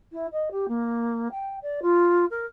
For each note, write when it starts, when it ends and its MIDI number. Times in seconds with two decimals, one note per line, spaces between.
0.12 0.26 64
0.32 0.49 75
0.51 0.66 67
0.68 1.28 58
1.31 1.57 79
1.62 1.80 74
1.82 2.25 65
2.30 2.45 70